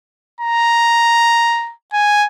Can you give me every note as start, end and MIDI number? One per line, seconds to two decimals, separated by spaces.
0.40 1.73 82
1.93 2.27 80